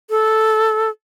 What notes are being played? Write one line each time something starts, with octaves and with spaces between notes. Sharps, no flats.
A4